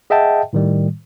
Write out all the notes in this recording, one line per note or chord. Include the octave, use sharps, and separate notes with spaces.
G#4 D#5 E5 F#5 G5 A5
A2 D#3 G3